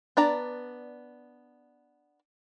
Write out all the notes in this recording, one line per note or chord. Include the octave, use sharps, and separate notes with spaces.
B3 D4 D5 A#5